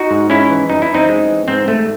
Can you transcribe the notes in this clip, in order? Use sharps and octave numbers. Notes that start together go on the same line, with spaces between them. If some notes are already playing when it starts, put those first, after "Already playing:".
Already playing: D#4 F#4
G#2
G#3 C#4 E4
E3
F#2 D#4
E4
F#2
C4 D#4
G#3
E3
G#2 C4
G#2 A3